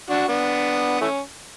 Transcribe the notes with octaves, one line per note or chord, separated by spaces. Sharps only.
D4 F#4
B3 D4
E3 A3 C#4